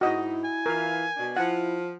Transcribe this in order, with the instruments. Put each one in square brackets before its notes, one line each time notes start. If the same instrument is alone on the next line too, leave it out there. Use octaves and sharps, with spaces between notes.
[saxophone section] G#2 D#4 [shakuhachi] E4 [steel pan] F#4 D#5
[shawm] G#5
[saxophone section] E3 F4 [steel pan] A#4
[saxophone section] B2 D4
[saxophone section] F3 F4 [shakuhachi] E4 [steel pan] F#5